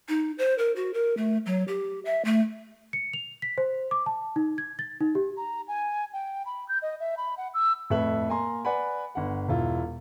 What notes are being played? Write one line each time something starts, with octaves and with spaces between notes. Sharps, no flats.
D#4
C5
A#4
F#4
A#4
A3
F#3
G4
E5
A3
C#7
F7
B6
C5
D6
A5
D#4
G#6
A6
D#4
G4
A#5
G#5
G5
B5
G6
D#5
E5
B5
F#5
E6
F2 A2 A4 B4 E5 F#7
A#3 G#5 A#5 C6
B4 D5 F#5 G#5 B5
G1 F#5
E1 E4 F4